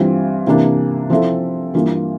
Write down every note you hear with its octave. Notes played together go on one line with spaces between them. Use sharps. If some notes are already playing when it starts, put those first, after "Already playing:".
Already playing: G2 E3 G3 C4 F4
C3 E3 A#3 D4
F3 C4 E4 A4
G2 E3 A#3 F4